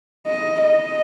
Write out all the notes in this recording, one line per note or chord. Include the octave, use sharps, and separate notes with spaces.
D#5
D#5